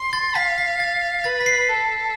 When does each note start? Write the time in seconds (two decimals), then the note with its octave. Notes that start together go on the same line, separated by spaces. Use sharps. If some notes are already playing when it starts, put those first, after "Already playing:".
Already playing: C6
0.13 A6
0.35 F5 B6
0.58 B6
0.80 A6
1.24 B4 A6
1.41 B6
1.46 C7
1.69 A4